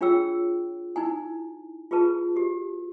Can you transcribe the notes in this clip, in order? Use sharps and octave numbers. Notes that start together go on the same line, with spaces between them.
D4 F4 G#4 C#5 G5 E6
D#4 E4 G#5
F4 G#4 B4 A5
F#4 G4